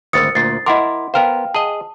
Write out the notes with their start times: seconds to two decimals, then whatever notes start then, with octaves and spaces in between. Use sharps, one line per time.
0.13 G#1 D2 A#4 C5 D#6 A6 C#7
0.35 D2 A#2 A6 C7
0.66 E4 A#4 D#5 F#5 C6 D6
1.14 B3 A#4 C5 F5 G5 F6
1.55 G#4 D#5 A5